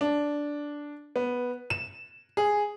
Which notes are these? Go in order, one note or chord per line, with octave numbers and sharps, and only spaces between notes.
D4
B3
E7
G#4